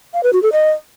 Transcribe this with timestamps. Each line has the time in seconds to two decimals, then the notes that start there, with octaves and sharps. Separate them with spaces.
0.14 F5
0.23 B4
0.33 F#4
0.43 A4
0.52 D#5